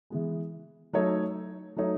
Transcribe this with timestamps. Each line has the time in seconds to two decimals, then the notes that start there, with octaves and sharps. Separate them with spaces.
0.10 E3 G#3 B3
0.93 F#3 A3 D#4 A4 C#5
1.76 F#3 A3 D#4 A4 C#5